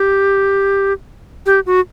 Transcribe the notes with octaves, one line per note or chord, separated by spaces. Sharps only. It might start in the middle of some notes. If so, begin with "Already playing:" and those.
Already playing: G4
G4
F#4